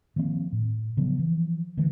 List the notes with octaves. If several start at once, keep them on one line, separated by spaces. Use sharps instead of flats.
D#3 F3 A#3 C4
A2
C#3 F3 F#3 B3
E3 F3
D3 E3 A3